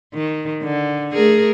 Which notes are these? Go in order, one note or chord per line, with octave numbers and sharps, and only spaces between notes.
D#3
D3
A3 G#4 A#4